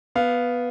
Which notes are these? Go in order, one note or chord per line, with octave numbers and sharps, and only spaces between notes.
B3 F5